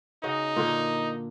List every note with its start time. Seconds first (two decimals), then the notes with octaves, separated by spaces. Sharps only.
0.23 C#3 D#4 F#4 D#5
0.56 A#2 D3 A#3